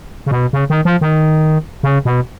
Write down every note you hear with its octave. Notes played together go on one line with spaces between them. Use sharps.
C#3
B2
C#3
D#3
F3
D#3
C#3
B2